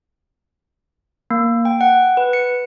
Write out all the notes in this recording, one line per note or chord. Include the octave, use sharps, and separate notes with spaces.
A#3
G5
F#5
B4
C#7